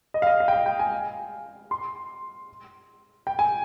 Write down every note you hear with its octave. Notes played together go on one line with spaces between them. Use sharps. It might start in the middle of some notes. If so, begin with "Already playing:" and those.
D#5
F5
D#5
F5
G5
F5
G5
G#5
C6
G5
G#5